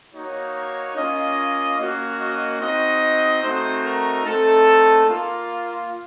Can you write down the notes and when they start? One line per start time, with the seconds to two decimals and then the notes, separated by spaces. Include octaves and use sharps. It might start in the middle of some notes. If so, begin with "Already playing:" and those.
0.14 A#3 D#4 F#4 C#5
0.97 A#3 C#4 F4 D#5
1.78 A#3 C#4 F#4
2.19 D#5
2.60 C4 D#4 F#4 D#5
3.42 A3 C4 D#4 F#4 C5
3.83 A#4
4.25 A3 C4 D#4 A4
5.07 A#3 F4